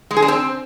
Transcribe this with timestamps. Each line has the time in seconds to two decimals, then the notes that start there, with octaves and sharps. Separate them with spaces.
0.11 G#3
0.17 G#4
0.22 D4
0.28 C4